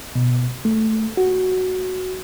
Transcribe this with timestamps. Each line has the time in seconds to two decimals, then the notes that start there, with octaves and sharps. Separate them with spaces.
0.15 B2
0.65 A3
1.17 F#4